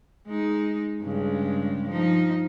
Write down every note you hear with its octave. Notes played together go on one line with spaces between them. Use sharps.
G#3 D#4
G2 C#3 G#3
F3 D#4